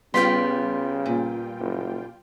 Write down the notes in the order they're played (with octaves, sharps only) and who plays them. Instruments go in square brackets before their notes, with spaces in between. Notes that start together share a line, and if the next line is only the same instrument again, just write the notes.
[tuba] C#3 [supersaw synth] G3 F4 G5 [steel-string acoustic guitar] B3 [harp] C6 B6
[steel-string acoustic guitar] A#2
[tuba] F#1